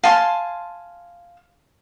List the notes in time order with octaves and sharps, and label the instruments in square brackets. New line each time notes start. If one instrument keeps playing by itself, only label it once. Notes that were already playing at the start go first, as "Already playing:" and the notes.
[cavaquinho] F5 G#5 A5 C6